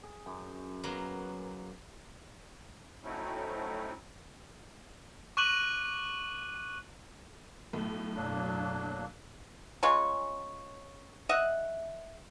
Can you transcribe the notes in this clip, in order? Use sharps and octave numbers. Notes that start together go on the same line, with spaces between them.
G#4
F#2
F#3 A#3 B3
F#3 A3 C4 C#4 D#4 E4
C#6 D6 F#6 D#7 F#7
B1 A2
F#2 B2 F#3 A#3 D4
C#3 G#3 F4 C#5
D#5 E5 F#5